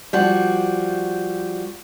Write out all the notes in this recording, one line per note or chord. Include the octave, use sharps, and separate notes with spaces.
F3 G3 F#4